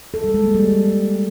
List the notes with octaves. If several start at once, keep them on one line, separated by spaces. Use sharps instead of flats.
A4
G3
G#3
A#3
G3